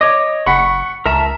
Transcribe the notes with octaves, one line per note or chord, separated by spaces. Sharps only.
C#5 D#5 D6
F#1 F#5 B5 C#6 B6
C#2 A#4 E5 A5 A#5